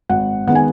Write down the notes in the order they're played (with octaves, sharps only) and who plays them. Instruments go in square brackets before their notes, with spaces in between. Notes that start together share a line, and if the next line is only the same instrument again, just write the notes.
[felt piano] G#1 F#5
D#3 G#3 B3 F#5
G#5